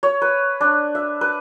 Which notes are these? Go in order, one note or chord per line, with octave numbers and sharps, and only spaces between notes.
C#5
B4
D4
E5
B4